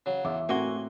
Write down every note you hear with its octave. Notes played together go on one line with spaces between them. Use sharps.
C#3 F#3
E2 E5 D6
A2 A#3 C4 F#4 G#5 C6